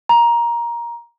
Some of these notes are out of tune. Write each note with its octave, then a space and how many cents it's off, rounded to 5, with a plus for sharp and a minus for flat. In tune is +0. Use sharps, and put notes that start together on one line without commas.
A#5 +15